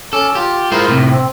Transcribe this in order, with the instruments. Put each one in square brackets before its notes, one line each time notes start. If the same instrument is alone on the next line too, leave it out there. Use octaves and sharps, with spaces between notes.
[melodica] C#4 D6 [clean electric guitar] A4
[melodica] F4 [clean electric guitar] G4
[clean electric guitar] G#3 F4 C5 [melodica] E4 A#4
[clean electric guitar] A2 C3
[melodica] C4